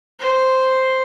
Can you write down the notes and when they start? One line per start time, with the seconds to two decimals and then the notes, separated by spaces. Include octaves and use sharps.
0.19 C5